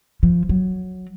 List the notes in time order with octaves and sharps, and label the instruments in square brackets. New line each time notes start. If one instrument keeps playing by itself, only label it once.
[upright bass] F3
F#3